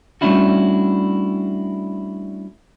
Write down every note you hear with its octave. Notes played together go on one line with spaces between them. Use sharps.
G3 A3 C#4 D4 E4 F#4